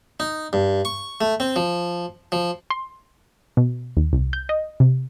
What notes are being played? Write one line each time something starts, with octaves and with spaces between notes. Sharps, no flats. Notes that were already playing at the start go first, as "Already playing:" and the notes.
D#4
G2
C#6
A3
C4
F3
F3
C6
B2
D#2
C2
G6
D#5
C3